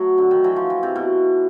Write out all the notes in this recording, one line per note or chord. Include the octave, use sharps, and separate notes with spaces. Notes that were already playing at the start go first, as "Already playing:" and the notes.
Already playing: F#3 A3
D3
D#3
E3 F#3
F3
E3
C3
B2